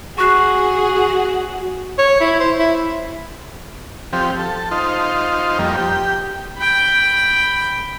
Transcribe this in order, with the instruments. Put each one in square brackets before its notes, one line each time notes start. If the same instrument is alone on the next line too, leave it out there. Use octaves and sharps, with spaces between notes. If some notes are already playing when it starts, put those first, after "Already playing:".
[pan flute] F#4 [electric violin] G#4 F#5 [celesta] C#6 F#6 C7
[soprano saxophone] C#5
E4
C5
E4
[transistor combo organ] F3 C4 G4
A4
D#4 F4 C5
F2 G3 A#3
G4
[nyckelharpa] G5 B5